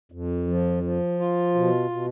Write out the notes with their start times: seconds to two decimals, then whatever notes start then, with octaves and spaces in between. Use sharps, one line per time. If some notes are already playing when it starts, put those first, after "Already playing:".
0.12 F2
0.48 F3
0.83 F3
1.19 F4
1.55 B2
1.90 B2